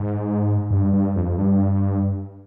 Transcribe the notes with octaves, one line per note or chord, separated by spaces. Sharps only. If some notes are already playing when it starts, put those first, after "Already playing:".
Already playing: G#2
G2
G2
F2
G2